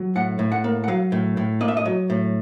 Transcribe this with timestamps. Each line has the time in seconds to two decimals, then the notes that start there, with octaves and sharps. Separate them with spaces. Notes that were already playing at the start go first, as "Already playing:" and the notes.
Already playing: F#3
0.15 A2 F#5
0.39 A2
0.52 F#5
0.64 A#3
0.84 F#5
0.88 F#3 F5
1.12 A2
1.37 A2
1.61 A#3 D#5
1.68 E5
1.77 D#5
1.85 F#3
2.10 A2